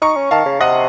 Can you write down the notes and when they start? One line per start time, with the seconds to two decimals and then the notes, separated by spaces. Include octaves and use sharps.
0.02 D#4 A#5 C#6
0.16 C#4
0.31 D#3 F5 A5
0.46 C#3
0.60 C3 D#5 F#5